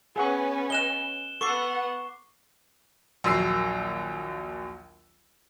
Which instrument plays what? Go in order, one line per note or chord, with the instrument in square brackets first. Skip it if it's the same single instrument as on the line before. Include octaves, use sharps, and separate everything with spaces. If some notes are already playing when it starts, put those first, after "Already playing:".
[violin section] B3 C#4 B4 [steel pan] G#4 F#5 C#6
[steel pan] D#5 [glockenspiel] F#6 E7 G7
[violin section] B3 F#5 [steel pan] A4 [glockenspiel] C#6 D6 C7
[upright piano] A#1 D#2 F#3 E6 C7